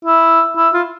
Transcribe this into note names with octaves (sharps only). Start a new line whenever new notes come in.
E4
E4
F4